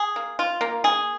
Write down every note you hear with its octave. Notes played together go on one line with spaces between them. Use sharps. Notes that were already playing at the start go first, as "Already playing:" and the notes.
Already playing: G#4
A#3
F4
A#3
G#4